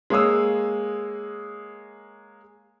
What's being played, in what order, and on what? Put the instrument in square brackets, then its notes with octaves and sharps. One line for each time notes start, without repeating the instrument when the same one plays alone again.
[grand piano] G#3 A#3 C#5 F5 D#6 E6